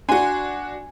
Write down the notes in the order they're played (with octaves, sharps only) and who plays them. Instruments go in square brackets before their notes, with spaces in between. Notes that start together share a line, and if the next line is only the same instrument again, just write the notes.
[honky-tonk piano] D4 F#4 [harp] G#5 C6